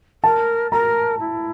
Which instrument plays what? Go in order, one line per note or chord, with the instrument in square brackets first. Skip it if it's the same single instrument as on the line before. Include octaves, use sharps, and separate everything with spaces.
[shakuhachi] A#4 [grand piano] A5
[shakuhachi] A#4 [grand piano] A#5
[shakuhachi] E4